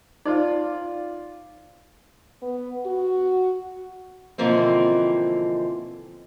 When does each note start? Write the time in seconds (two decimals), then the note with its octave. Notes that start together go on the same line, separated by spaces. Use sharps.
0.26 D#4 F4 C5 D5
2.42 B3
2.86 F#4
4.38 B2 D3 E3 F3 A#3 C4